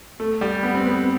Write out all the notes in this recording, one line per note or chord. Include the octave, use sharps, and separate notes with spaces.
A3
G3
B3
C4
B3